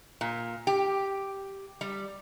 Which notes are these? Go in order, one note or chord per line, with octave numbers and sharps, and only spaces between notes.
A#2
G4
G3